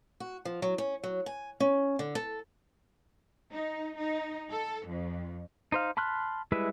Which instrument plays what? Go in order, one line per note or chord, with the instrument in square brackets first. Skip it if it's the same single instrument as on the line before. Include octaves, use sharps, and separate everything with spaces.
[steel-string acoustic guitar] F#4
F3
F#3
C#4
F#3
G#5
C#4
D3
A4
[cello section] D#4
D#4
A4
F2
[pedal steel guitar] D#4 C5 F5
A5 B5 C6 F6 F#6
G3 G#3 E4 B4 E5